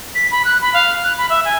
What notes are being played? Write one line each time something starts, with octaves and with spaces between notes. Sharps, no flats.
B6
B5
F#6
B5
F5
F#6
B5
E5
G#5